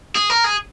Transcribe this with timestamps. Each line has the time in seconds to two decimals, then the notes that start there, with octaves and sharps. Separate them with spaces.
0.15 G#4
0.30 A#4
0.44 G#4